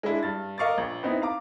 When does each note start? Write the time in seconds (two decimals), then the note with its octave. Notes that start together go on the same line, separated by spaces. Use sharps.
0.03 G#3 D4 E4
0.23 G2 A6
0.58 A#4 D#5 F5 C#6 D6 A6
0.78 A#1
1.03 B3 C4 D#4 E4
1.22 F5 A#5 D6